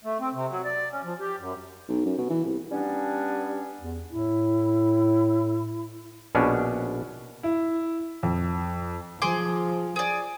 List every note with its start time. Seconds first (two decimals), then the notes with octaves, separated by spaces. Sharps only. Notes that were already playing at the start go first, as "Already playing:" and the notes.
0.04 A3
0.20 C4
0.33 C3
0.49 F#3
0.65 D5
0.92 C#4
1.03 F3
1.20 G4
1.38 F#2
1.88 B1
2.06 F#2
2.18 B2
2.30 E3
2.45 C2
2.71 G3 B3 C#4 D4
3.80 E2
4.11 A2 E4
6.35 A#1 B2 C#4 D4
7.43 E4
8.23 F2
9.22 F3 G#4 C6 D6
9.96 G#4 D5